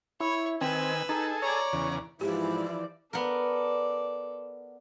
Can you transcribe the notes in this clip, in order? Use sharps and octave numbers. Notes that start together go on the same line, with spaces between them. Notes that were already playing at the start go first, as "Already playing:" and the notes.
E4 C#5
D#3 C4 B4 G#5 E6
D#4 G#4 A4
C#5 D5 A#5
E2 C#3
G#2 E3 F3 E4 G4 D5
B3 A4 A#4 D5